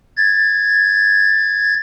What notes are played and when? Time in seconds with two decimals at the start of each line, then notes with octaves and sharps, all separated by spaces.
0.17 G#6 A6